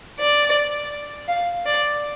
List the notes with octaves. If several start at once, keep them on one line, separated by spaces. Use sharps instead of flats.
D5
F5
D5